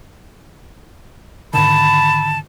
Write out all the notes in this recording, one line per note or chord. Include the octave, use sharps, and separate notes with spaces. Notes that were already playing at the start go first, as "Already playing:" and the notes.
G#2 D3 D#3 A5 B5